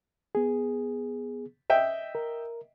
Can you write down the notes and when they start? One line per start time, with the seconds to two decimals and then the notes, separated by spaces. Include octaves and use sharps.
0.35 B3 G#4
1.70 D#5 E5 G5
2.15 A#4